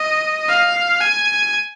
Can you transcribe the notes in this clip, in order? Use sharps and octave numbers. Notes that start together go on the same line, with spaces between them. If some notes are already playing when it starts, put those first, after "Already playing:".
Already playing: D#5
F5
G#5